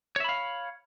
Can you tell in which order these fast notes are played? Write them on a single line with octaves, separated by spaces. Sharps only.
C#5 E5 B5 F5